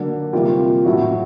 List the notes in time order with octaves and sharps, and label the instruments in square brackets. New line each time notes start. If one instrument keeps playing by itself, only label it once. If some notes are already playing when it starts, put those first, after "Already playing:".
Already playing: [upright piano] D3 F#3 A#3
C3 E3 G3 A#3 F4 G4
A2 F#3 A3 E4 F#4